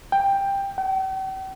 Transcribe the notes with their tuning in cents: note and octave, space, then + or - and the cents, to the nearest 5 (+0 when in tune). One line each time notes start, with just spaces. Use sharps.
G5 +10
G5 -45